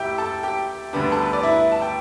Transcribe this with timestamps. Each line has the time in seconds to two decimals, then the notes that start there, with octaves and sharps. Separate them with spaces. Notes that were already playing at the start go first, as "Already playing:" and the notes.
Already playing: D2 E4 G4 E5 G5
0.18 A4 A5
0.43 G4 G5
0.93 D2 D3 G3 B3 D4
1.12 A4
1.22 B4
1.33 D5
1.43 E4 E5
1.72 A5
1.82 G5